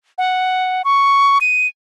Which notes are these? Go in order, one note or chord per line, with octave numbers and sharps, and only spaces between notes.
F#5
C#6
D#7